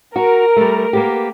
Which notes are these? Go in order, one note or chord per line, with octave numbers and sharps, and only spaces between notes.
F#4 A#4
G3 A3
A#3 B3 G4